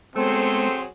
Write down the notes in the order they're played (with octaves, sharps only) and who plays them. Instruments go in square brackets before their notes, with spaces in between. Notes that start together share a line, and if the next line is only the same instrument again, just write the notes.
[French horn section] F#3 G#4 C5 [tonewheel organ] G#3 B3 [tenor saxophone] A3 [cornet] C4